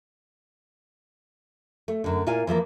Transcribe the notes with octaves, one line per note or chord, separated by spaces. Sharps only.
A3
F#2 D3
A#2 E4 F4 F5 G#5
E3 F3 A3 A#3